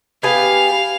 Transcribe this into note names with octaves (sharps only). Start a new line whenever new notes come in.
B3 G4 F5 G#5